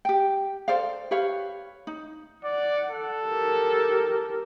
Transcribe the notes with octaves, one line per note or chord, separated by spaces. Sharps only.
G4 G5
A4 C5 D5 F5
G4 B4 C#5 F5
D#4
D5 F#5
A4
G4 A#4